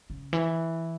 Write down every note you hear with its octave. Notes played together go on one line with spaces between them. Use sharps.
C#3
E3